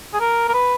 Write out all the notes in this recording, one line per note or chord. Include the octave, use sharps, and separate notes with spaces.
G#4
A#4
A#4
B4